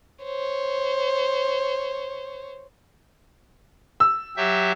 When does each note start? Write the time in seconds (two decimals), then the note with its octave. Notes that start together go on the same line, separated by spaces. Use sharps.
0.24 C5 C#5
4.00 E6
4.37 F#3 G4 E5